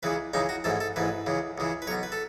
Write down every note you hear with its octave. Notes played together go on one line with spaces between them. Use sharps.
C#2 C#3 E3 B4
C#2 C#3 E3 D#4
F#4
A1 G#2 E3 A4
A4
A1 G#2 E3 B4
C#2 C#3 E3
C#2 C#3 E3
B4
B1 B2 C#5
B4
A4